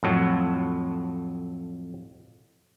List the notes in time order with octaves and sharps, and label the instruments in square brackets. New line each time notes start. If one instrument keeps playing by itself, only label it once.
[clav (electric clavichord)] F2 A2 F#3